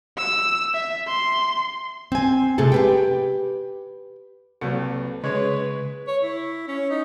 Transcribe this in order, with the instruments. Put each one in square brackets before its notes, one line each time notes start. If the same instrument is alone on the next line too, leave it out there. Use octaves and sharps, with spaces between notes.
[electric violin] E6
E5
C6
[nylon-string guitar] C4 G#5
C3 G#3 A3 G#4 A4
G4 B4 G5
[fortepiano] C2 [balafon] F#3 A#3 F#4 [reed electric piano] A4 B4
[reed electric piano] C#3 C#6 G#6 [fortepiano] G#3 C#5 [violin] B4
[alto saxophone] C#5
E4
C#4
D#4